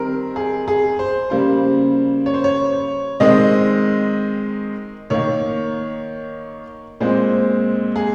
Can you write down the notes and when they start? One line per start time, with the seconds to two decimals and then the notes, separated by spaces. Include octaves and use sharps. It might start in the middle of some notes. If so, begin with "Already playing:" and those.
Already playing: D#3 G3 C4 A#4
0.36 G#4
0.68 G#4
0.99 C5
1.30 C#3 G3 A#3 C5
2.26 C#5
2.34 C5
2.44 C#5
3.20 D#3 G#3 C4 D#5
5.10 D#3 A#3 C#5
7.00 A#2 G#3 C4 C5
7.96 G#4